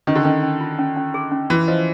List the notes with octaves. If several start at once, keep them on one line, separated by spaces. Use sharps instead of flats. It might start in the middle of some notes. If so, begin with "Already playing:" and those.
D#3 C#4
D3
D#3 C#4
C#4
F4
C#4
C#4
G#4
C#4
E3 C6
F3 D#5